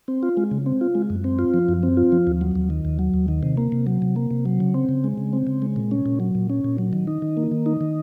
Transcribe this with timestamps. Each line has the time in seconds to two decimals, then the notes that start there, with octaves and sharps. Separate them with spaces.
0.08 C4
0.23 F4
0.37 G#3
0.51 C#3
0.66 C4
0.81 F4
0.95 G#3
1.10 F#2
1.24 C4
1.39 F4
1.54 F3
1.69 F#2
1.83 C4
1.97 F4
2.12 F3
2.27 D#2
2.41 F#3
2.56 D#2
2.70 D#3
2.85 D#2
2.99 F#3
3.14 D#2
3.28 D#3
3.43 C3
3.57 A#3
3.72 C3
3.87 F#3
4.02 C3
4.16 A#3
4.31 C3
4.46 F#3
4.60 C#3
4.74 C4
4.89 C#3
5.04 G#3
5.18 C#3
5.33 C4
5.47 C#3
5.62 G#3
5.76 A#2
5.91 C#4
6.06 A#2
6.20 F#3
6.35 A#2
6.50 C#4
6.64 A#2
6.78 F#3
6.93 D#3
7.07 D#4
7.22 D#3
7.37 A#3
7.51 D#3
7.66 D#4
7.81 D#3